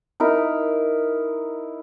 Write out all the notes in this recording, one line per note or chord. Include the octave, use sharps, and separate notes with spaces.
D#4 E4 A#4